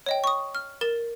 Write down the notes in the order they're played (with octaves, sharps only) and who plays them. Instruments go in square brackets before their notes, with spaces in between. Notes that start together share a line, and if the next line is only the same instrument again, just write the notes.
[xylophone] C#5 D#5 G5
C#6 D#6
F6
A#4 A6 E7